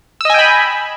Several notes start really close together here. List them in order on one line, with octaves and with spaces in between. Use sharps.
E6 D#5 G#5 G5 B5